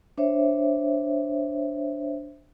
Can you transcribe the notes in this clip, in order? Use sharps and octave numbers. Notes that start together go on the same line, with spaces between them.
D4 C5 C#5 E5